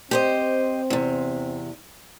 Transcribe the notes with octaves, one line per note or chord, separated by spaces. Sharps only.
C4 G4 C5 D#5
E2 C3